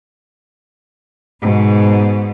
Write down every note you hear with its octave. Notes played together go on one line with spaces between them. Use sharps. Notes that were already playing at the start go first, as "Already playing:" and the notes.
G#2 B2